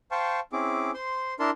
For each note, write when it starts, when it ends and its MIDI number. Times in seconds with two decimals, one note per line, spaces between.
0.11 0.40 72
0.11 0.40 77
0.11 0.40 79
0.11 0.40 81
0.11 0.40 85
0.53 0.91 60
0.53 0.91 61
0.53 0.91 64
0.53 0.91 68
0.53 0.91 86
0.94 1.34 72
0.94 1.34 84
1.40 1.50 62
1.40 1.50 64
1.40 1.50 70
1.40 1.50 81
1.40 1.50 84